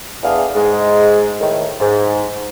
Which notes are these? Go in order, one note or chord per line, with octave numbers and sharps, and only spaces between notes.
E2 A3 B3 D4 G#4 F5
G#2 G#3
A2 D#3
G#2